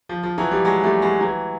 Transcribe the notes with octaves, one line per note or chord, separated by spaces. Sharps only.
F3
F3
E3 F#3
F3 G3
F#3 G#3
G3 A3
F#3 G#3
E3 F#3